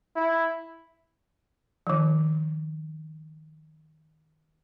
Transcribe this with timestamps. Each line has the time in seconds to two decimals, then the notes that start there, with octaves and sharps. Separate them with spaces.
0.16 E4
1.87 D#3 F3